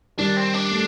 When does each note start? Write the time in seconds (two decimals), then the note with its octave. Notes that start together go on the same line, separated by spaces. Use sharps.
0.18 D#3 G3 D4
0.37 C4
0.54 D4
0.71 A3